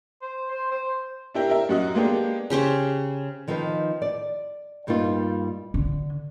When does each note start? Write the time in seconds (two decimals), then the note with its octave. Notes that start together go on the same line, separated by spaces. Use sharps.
0.22 C5
0.50 C5
0.71 C5
1.34 D4 E4 G4 A#4
1.50 A#4 E5
1.69 F#2 F#4 D#5
1.95 G#3 A#3 B3 D4 G4
2.50 C#3 G4 C5 C#6
3.48 D#3 F3 C4 D#4 B4
4.02 D5
4.87 G2 G3 A#3 D#4 F4
5.74 D3